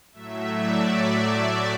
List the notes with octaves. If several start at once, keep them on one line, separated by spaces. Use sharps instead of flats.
A2 F#3 A3 E5
D5
D5